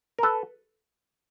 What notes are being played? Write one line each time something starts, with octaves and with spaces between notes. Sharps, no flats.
A#4
A4 B4